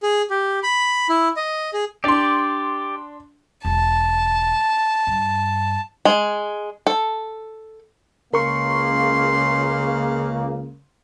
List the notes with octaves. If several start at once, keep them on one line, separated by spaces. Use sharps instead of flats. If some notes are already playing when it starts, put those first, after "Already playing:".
G#4
G4
B5
E4
D#5
G#4
D4 G4 D5 C6
E1 A5
G2
G#3
A4
C#2 C#3 A#3 A#4 C6 C#6